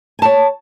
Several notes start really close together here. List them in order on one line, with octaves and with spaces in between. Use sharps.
G#5 A5 C#5